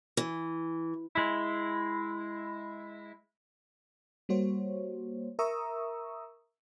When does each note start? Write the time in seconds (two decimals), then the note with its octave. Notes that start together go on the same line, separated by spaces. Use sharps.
0.17 E3
1.15 G#3 E4
4.29 G3 A#3 F#4 C5 C#5
5.39 A#4 E5 A#5 C#6 D#6 E6